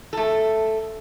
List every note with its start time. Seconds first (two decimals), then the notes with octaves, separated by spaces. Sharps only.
0.13 A3 A4